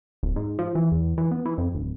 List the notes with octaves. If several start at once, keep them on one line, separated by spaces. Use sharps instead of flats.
D1
G#2
F3
E3
E2
E3
B3
E3
F2
D1